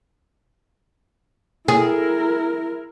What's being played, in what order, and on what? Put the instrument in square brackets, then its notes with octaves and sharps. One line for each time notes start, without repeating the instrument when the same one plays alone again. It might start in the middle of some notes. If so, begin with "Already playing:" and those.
[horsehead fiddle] E4 A#4 [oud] G#4